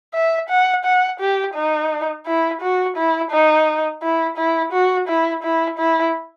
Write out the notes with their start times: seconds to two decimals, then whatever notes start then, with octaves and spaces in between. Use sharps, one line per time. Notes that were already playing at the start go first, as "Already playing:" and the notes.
0.14 E5
0.49 F#5
0.85 F#5
1.20 G4
1.55 D#4
2.26 E4
2.62 F#4
2.97 E4
3.32 D#4
4.02 E4
4.37 E4
4.72 F#4
5.08 E4
5.43 E4
5.78 E4